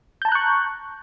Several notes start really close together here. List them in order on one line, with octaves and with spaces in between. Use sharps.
G6 A5 A#5 F#6 C#6